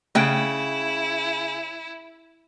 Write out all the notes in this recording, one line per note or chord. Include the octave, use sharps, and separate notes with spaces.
C#3 A3 E4 E5 G5 F#6